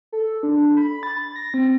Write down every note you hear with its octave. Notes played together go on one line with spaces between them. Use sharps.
A4
D4
B5
A6
A#6
C4